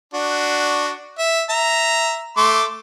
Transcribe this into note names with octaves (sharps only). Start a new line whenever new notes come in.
D4 F#4
E5
E5 A#5
A3 C6 D6